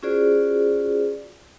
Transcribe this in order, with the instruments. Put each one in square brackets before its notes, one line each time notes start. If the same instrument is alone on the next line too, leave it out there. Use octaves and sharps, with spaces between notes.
[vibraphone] C#4 F4 F#4 G#4 C5 D5